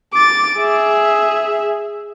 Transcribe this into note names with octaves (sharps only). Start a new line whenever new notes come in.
D6 A6
G#4 E5